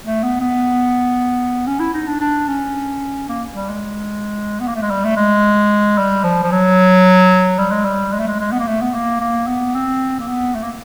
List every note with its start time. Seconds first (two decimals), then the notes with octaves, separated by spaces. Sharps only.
0.05 A3
0.23 B3
0.40 B3
1.67 C#4
1.80 E4
1.94 D#4
2.07 D4
2.20 D4
2.48 C#4
3.29 A#3
3.55 G3
3.69 G#3
4.60 B3
4.67 A#3
4.75 A3
4.82 G#3
4.90 G3
5.05 A3
5.16 G#3
5.97 G3
6.24 F3
6.43 F3
6.51 F#3
7.58 G3
7.71 G#3
7.85 G3
8.13 G#3
8.19 A3
8.28 G#3
8.39 G#3
8.52 B3
8.60 A#3
8.67 A3
8.81 B3
8.94 A#3
9.20 A#3
9.47 B3
9.75 C4
10.19 A#3
10.27 B3
10.55 A3
10.62 A#3